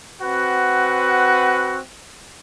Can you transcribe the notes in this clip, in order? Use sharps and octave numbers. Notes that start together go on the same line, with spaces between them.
C4 F#4 B4 F#5